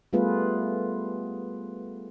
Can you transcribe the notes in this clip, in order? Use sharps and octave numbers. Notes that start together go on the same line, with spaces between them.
G3 A3 B3 F4 G#4 B4